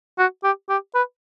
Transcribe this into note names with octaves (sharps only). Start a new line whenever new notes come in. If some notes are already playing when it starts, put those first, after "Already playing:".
F#4
G4
G4
B4